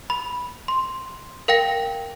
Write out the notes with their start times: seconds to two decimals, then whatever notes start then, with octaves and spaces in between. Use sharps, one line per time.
0.10 B5
0.68 C6
1.48 A#4 F5 G5 A#6